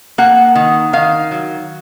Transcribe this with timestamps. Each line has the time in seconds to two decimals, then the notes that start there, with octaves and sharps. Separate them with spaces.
0.18 A#3 F#5
0.55 D#3
0.93 D#3 F5
1.31 F#3